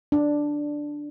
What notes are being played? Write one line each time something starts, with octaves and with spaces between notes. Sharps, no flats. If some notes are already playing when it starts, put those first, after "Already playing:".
D4